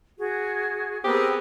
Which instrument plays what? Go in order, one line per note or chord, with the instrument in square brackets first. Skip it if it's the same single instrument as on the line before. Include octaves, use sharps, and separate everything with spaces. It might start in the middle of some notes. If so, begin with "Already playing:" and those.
[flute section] F#4 G#4
[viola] B3 G#4 [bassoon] C4 [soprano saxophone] G4 [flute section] A#4 D#6 E6